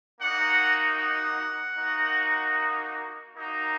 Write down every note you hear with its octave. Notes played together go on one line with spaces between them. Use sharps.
A#3 D#4 F#4 F#5
F#5
A#3 D#4 F#4
A#3 D#4 F#4